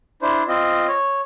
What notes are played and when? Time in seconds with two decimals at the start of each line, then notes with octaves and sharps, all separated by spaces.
0.22 D4 E4 C5
0.48 C4 F4 D#5
0.88 C#5